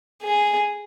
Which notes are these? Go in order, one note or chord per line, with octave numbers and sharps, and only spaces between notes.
G#4